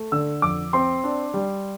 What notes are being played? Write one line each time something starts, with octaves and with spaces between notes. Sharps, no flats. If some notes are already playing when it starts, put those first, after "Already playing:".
Already playing: A3
D3 E6
F2 D6
C4 C6
D4
G3